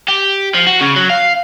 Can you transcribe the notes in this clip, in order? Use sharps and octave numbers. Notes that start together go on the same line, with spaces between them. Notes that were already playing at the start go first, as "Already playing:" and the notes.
G4
F3
F#4
C#3
F#3
F5